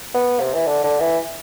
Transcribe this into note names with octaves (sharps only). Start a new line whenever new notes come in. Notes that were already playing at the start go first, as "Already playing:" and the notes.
B3
C3
E3
D3
D3
E3